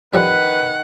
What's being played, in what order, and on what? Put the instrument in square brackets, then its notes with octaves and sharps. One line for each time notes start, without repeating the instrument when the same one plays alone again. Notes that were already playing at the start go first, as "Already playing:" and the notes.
[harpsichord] F2 F3 G3 [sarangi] D#3 [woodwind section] B4 [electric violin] F#5